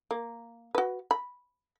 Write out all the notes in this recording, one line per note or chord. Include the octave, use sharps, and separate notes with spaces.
A#3
F#4 B4
B5